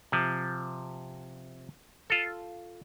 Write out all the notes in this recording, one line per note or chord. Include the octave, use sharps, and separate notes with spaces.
C3 F3
F4 A4